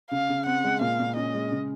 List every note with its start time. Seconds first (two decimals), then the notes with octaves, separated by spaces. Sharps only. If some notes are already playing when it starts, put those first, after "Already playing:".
0.11 C#3 F5
0.29 C#3
0.46 C4 F#5
0.64 G#3
0.81 A#2 F5
1.00 A#2
1.16 C#4 D#5
1.34 G#3
1.51 C#3